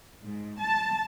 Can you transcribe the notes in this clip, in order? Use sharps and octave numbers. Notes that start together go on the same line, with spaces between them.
G#2
A5